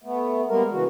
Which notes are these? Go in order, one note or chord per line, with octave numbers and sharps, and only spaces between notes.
A3 B3
G3 G#3 A#3 B3 A#4
C#3 E3 F#4